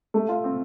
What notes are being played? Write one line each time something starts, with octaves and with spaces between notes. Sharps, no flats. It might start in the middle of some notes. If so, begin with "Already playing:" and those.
A3
F4
C4